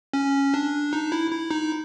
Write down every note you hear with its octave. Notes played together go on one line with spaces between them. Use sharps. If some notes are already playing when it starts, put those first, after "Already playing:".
C#4
D4
D#4
E4
E4
D#4